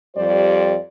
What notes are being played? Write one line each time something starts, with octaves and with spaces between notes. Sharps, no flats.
F2 G3 G4 C5 D5